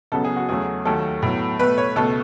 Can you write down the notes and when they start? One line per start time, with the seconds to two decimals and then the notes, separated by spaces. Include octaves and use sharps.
0.12 C#2 C#3 F#3 B3 A4
0.25 G#4
0.36 F#4
0.49 E2 C#3 F#3 A3 G#4
0.85 D#2 D#3 F#3 A3 A4
1.22 A2 F#3 B3
1.59 B2 A3 B4
1.78 C#5
1.96 C#2 B2 A3 A4